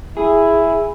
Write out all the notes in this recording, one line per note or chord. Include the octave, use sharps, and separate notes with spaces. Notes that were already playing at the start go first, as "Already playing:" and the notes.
E4 G#4